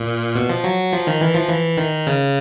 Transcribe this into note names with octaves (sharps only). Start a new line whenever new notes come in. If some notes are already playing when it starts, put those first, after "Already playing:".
Already playing: A#2
B2
F3
F#3
F3
D#3
E3
F3
E3
D#3
C#3